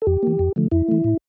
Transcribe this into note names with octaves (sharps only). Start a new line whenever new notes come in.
A4
F2 G4
E3 A#3
F2
D3 F3 A3
F2 E4
E3 A3
A2